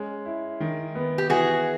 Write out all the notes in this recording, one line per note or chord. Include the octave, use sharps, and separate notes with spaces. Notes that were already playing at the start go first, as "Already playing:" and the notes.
Already playing: G#3 C#4
E4
D#3
B3
G4
E3 F#4 G#4